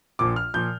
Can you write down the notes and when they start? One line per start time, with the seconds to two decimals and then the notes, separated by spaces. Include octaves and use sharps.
0.19 A#1 A#2 F3 D6
0.36 F6
0.54 A#2 F3 G6